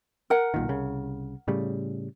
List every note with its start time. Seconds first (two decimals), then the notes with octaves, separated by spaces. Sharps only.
0.30 A#4 F#5
0.54 B1 A#2 D#3
0.68 C2 C#3
1.48 A2 C#3 G3